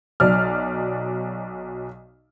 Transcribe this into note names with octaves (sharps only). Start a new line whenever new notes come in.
B1 F#3 D5 F6